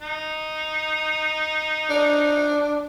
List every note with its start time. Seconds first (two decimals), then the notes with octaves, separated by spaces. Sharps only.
0.01 D#4
1.90 D4